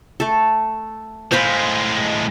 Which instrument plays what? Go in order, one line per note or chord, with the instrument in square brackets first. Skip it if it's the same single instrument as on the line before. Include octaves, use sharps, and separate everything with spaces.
[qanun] A3 A4
[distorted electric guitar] A2 G#3 [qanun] C5 F5 B5